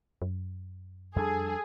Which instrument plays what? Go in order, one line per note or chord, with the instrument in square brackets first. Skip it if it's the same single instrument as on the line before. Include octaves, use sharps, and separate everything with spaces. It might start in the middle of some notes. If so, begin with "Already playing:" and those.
[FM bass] F#2
[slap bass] F2 G3 D4 [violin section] G#4 [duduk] A4